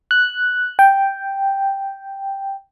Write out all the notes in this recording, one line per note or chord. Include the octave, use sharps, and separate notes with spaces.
F#6
G5